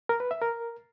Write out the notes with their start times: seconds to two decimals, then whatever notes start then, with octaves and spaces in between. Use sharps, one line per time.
0.09 A#4
0.20 B4
0.31 E5
0.42 A#4